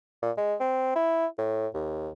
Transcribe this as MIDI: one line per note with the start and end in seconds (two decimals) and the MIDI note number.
0.22 0.31 46
0.37 0.55 56
0.60 0.92 60
0.96 1.27 64
1.38 1.67 45
1.74 2.10 39